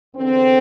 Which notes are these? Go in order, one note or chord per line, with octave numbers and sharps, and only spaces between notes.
E2 D3 C4